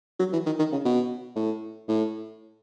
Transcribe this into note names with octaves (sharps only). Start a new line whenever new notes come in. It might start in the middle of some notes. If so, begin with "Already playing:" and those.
F#3
E3
D#3
D#3
C#3
B2
A2
A2